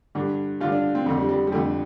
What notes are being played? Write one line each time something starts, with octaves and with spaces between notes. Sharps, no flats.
G2 D3
G2 D3 F4
D4
C4
F2 D3 A3
G3
G3
G3
F2 D3 A3